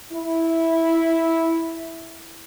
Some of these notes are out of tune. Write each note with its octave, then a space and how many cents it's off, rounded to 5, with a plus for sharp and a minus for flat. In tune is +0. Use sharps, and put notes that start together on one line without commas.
E4 -5